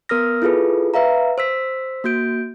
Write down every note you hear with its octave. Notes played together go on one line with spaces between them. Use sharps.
B3 A#4 D#6 F6 A#6
E4 F4 G#4 A4 B4
B4 E5 F5 A#5
C5 E6 B6
A#3 F#4 G6 D7